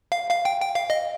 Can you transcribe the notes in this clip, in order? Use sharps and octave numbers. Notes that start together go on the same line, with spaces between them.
F5
F5
G5
G5
F5
D#5